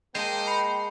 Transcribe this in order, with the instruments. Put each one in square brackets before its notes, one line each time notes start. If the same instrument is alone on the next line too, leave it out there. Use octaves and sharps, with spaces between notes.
[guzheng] G#3 D#5 [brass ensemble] A#3 G5 [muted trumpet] C5 [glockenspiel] A5 C7
[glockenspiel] B5 C7 C#7